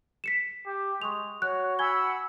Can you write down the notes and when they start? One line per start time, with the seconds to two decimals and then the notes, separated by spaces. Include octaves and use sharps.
0.24 B6 C#7 E7
0.66 G4
1.02 G#3 C#6 D#6 F7
1.42 F#4 C#5 F#6
1.79 F#5 G#5 B5 E6 G#6 G7